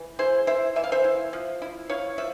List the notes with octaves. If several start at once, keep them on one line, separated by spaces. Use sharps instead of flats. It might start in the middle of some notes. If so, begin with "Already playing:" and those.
Already playing: E3
E4 G#4 C5
E4 C5 E5
E3 E5
F5
C5 E5
E4
F3
E4
E4 C#5 F5
F3 E5